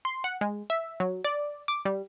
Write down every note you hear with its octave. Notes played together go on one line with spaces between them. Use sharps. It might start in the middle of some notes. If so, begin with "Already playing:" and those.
C6
F#5
G#3
E5
F#3
D5
D6
G3